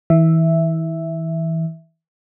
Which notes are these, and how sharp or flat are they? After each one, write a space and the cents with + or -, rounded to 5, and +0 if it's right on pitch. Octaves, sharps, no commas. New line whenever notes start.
E3 -30 E5 +0